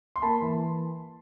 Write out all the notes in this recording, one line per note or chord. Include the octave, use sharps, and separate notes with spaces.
C6
A#3 A5 B5
E3